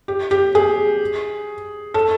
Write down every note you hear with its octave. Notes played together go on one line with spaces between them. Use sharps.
G4
G4
G#4
A4